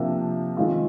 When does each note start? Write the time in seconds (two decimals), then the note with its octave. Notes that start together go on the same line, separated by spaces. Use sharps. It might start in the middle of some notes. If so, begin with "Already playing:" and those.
Already playing: C3 F3 A#3 D4 F4
0.57 D#3 G#3 C4 F4